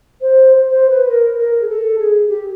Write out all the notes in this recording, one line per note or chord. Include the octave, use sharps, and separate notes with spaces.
C5
C5
B4
A#4
A#4
G#4
A4
G#4
G4